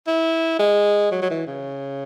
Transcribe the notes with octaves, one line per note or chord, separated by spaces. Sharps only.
E4
G#3
F#3
F#3
E3
C#3